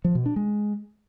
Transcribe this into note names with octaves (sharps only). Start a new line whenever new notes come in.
F3
B2
D4
G#3